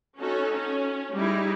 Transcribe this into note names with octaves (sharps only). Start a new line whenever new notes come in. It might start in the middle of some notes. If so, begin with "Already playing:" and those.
C#4 D#4 F#4 A4
C#4
G3 G#3 D#4 E4